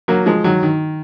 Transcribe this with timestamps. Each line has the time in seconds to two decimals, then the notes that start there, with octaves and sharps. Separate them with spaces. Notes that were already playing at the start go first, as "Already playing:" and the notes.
0.08 F#3 A#3
0.26 F3 G#3
0.44 D#3 F#3
0.63 D#3